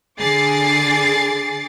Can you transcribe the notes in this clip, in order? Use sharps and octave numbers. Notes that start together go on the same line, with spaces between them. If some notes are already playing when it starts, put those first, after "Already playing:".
D3 G#4 D6 A6 C7